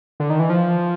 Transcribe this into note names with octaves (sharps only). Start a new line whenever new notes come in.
D3
D#3
E3
F3